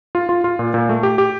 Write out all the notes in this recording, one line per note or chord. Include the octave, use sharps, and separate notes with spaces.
F4
F4
F4
A#2
A#2
A3
G4
G4